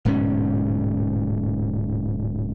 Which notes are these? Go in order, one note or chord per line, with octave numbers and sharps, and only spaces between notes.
D1 G#2 B2 C#4